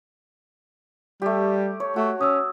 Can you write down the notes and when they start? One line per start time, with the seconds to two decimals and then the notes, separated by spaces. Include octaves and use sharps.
1.22 G3 A3 G4
1.80 C#5
1.96 A3 F#4
2.21 C#4 D#6 E6